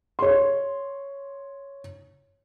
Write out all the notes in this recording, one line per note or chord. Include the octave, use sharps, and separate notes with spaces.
C#5 C6